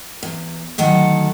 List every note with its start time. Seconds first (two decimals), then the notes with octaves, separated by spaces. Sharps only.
0.23 E2
0.78 D2 D#3 F#3 A4 F#5